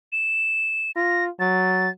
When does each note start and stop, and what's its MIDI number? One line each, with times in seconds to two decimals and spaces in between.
0.12 0.91 100
0.96 1.29 65
0.96 1.24 94
1.40 1.88 54
1.40 1.90 93